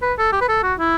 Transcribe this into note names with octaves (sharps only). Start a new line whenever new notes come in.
B4
A4
G4
B4
A4
F#4
E4